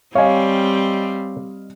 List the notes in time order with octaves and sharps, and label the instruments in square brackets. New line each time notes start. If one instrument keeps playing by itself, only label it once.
[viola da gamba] G3 C4 [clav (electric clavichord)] C#5 G#5 [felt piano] D#5 F5